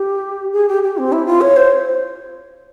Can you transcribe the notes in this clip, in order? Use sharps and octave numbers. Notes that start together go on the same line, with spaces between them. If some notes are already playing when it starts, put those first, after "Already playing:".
Already playing: G4
G#4
G4
G4
C4
E4
F4
C#5
C5